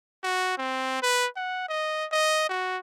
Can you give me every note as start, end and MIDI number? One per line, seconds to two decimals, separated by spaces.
0.23 0.57 66
0.58 1.00 60
1.02 1.27 71
1.36 1.66 78
1.69 2.05 75
2.12 2.45 75
2.49 2.78 66